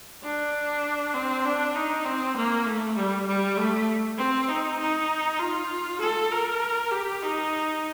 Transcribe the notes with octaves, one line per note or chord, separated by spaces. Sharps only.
D4
C4
D4
D#4
C4
A#3
A3
G3
G3
A3
C4
D#4
D#4
F4
A4
A#4
G4
D#4